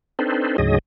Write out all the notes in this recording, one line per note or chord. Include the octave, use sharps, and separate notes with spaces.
C4 D4 D#4 A4 B4 C5
D2 G#2 C#3 F#3 G#4 D#5